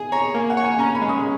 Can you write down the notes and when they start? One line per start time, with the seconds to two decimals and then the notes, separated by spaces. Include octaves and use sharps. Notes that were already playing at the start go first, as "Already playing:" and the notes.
Already playing: G#4 G#5
0.12 C#5 A#5
0.34 A#3 G#5
0.50 F#5
0.57 C#5
0.64 G#5
0.79 C#4 A#5
0.95 B5
1.02 G#3
1.09 D#6